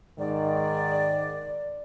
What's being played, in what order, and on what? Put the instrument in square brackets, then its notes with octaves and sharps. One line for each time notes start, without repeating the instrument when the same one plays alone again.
[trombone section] G#2 D#3 [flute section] D5